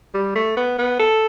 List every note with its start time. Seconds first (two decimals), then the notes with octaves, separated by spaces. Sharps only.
0.14 G3
0.35 A3
0.57 B3
0.79 B3
0.99 A4